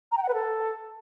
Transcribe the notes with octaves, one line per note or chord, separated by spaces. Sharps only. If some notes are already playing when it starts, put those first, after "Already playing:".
A#5
G5
F#5
B4
A4